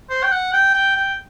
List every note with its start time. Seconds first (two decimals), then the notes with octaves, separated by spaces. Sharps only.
0.09 C5
0.23 G5
0.31 F#5
0.53 G5
0.74 G5
0.96 G5